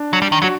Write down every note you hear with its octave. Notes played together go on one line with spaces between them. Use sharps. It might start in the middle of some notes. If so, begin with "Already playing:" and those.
Already playing: D4
F#3
G3
D#3
F#3 F#4